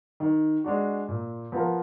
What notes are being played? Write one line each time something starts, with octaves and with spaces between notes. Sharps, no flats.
D#3
G#3 D4 F#4
A#2
F3 B3 F4 A#4